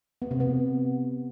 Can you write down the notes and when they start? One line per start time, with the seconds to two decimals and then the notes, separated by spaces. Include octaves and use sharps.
0.22 B3
0.31 C3
0.40 B3